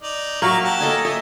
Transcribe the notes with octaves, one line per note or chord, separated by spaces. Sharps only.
D#4 D5
F#3 A#3 E5 F5 C#6
G4 F#5 A5
A4 D#5 G#5
D#5 E5 G#5